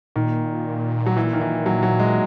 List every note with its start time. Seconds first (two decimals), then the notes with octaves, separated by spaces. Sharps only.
0.16 A#2 D#3
1.06 F#3
1.17 E3
1.33 D#3
1.41 E3
1.66 F#3
1.83 F#3
2.00 G#3